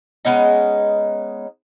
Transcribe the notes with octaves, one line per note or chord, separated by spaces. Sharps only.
G#3 B3 C#4 D#4